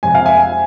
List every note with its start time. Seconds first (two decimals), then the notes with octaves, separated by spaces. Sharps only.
0.03 F2 C3 G#3 C4 G#5
0.15 F5
0.25 E5 G#5